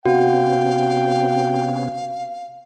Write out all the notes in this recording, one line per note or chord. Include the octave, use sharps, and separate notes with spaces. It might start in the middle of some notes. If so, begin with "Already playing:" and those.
C3 B3 C#4 F#4 F5 G5